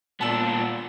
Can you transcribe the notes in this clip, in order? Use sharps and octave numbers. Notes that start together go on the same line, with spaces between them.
A#2 B3 D4 A5 E6